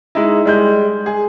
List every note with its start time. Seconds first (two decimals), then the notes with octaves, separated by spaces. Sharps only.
0.15 G#3 D#4 E4
0.45 G3 G#3 G6
1.06 G#4